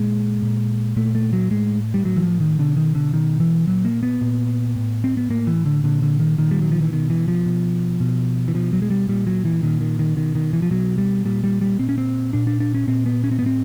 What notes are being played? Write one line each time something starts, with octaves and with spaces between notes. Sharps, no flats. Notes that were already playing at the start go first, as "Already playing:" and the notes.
Already playing: A#2 G#3
A#2
A#2 A3
A3
F#3
A2 G#3
G3
A2 F#3
E3
F3
D#3
B2 D3
D#3
D3
B2 D#3
E3
A#2 F#3
A#3
B3
A#2
A2
C4
B3
A2 A#3
E3
D3
A#2 D3
D3
D#3
A#2 D#3
G3
F#3
F3
E3
B2 D#3
E3
F3
B2
B2
E3
B2 F3
F#3
G#3
G3
A#2 G3
F#3
E3
A#2 D#3
D#3
D#3
B2 D#3
D#3
E3
F3
B2 F#3
G3
A#2 G3
G3
G3
A#2 C4
C#4
C4
A#2 D4
D4
D4
C#4
A#2 C4
B3
C#4
C4
B3
A2 C4